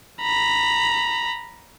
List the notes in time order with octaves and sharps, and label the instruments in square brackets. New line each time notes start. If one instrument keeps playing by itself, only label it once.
[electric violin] A#5 B5